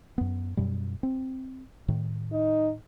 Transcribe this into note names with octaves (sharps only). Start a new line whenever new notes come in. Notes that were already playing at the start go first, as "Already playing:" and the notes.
F#2 B3
F#2 B2 G3
C4
A2 D#3
D#4